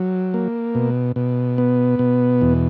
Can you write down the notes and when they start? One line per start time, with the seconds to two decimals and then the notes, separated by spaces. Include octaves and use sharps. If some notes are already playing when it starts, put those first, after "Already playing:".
Already playing: F#3
0.34 A#3
0.75 B2
1.16 B2
1.58 B3
1.99 B2
2.41 E2